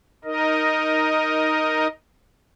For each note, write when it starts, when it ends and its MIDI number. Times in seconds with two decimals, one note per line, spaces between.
0.24 1.87 63
0.24 1.87 70
0.24 1.87 75